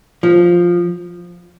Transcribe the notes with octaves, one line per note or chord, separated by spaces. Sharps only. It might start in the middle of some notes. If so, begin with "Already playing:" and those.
F3